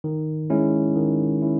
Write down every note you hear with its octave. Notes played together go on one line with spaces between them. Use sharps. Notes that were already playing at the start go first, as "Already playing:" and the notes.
D#3
G#3 C#4 E4
D#3
C#4 E4